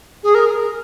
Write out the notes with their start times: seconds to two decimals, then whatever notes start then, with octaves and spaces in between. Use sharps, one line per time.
0.23 G#4
0.34 A#4